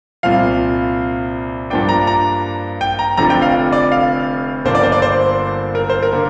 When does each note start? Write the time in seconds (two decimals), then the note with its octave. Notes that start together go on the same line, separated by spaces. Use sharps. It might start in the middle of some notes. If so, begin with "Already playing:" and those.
0.23 C2 A#2 F3 F5
1.70 G2 F3 A#3 D4 G5
1.89 A#5
2.07 A#5
2.81 G5
2.99 A#5
3.17 F1 F2 D3 F3 D4 A#5
3.30 G5
3.42 F5
3.72 D5
3.92 F5
4.65 G1 G2 D3 A#3 D4 C5
4.75 D5
4.83 C5
4.92 D5
5.02 C5
5.75 A#4
5.90 C5
6.03 A#4
6.12 D3 A#3